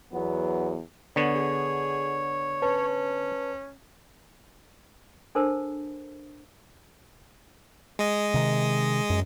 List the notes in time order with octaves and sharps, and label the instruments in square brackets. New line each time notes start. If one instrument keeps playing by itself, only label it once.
[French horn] E2 [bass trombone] F#3 [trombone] B3
[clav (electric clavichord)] D3 B3 [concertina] C#5
[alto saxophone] G#4
[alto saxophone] C#4 [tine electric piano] B4 A5
[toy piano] D4 A4 A#4 C5 A5
[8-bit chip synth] G#3 D#5
[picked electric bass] C3 D#3
F#2